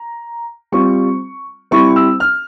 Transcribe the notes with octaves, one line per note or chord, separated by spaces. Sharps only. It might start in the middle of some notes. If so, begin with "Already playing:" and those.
Already playing: A#5
G3 C4 F4 C#6
G3 C4 E4 C#6
E6
F6